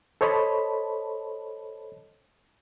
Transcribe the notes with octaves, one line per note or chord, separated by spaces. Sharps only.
A4 C5 C#5 D#5 A5 B5